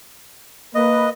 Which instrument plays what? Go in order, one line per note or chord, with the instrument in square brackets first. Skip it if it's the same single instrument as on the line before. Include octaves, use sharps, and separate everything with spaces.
[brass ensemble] A#3 B4 [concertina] D#5